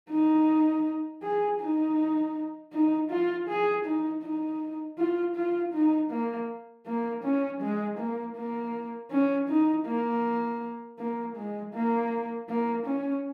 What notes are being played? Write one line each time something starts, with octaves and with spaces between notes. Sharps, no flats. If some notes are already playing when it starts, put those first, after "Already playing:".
D#4
G#4
D#4
D#4
F4
G#4
D#4
D#4
F4
F4
D#4
A#3
A#3
C#4
G#3
A#3
A#3
C#4
D#4
A#3
A#3
G#3
A#3
A#3
C#4